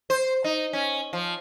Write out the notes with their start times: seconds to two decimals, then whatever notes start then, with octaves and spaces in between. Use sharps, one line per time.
0.10 C5
0.44 D#4
0.73 C#4
1.13 F3